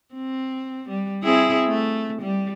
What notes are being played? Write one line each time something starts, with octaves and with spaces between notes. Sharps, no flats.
C4
G3
C4 E4 G#4
A3
G3